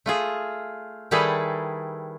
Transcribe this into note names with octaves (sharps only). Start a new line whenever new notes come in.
A3 F4 G#4
D#3 G3 E4 G#4 A4 B4